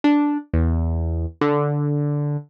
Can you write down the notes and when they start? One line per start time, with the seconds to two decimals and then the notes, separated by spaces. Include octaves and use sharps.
0.04 D4
0.53 E2
1.41 D3